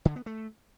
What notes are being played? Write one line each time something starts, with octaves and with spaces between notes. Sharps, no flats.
D3
B3
A3